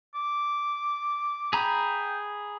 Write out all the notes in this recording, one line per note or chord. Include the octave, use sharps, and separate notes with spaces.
D6
G#4 G5 A#5 B5